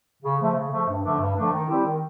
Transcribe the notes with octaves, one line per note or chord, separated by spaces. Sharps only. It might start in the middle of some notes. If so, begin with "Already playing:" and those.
C#3
F3 A3
C#3
F3 A3
G2
D3 F3 A3 D4
G2
D3 F3 A3 D4
D#3
G3 C4 E4 G4
D#3